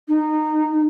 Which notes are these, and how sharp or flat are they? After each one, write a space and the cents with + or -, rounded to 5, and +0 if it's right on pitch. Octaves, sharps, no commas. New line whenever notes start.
D#4 -20